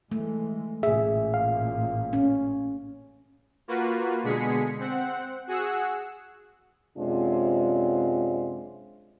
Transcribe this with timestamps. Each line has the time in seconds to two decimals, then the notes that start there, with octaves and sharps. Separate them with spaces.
0.12 E3 G#3 A3
0.83 A1 A#2 G#4 E5
1.34 F5
2.13 C#4
3.68 A#3 F4 F#4 B4
4.23 B2 D3 G#3 G#4 B6 C#7
4.79 C4 F#5
5.47 F#4 G#4 F#5 E6
6.97 F#2 C3 G#3 D4 F4